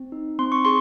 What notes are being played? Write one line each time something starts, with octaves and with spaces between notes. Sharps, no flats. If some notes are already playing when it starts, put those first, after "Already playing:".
Already playing: C4
D#4
C4 C6
C#6
G#4 C6